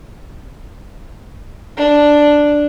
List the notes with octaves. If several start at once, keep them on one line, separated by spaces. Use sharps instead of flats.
D4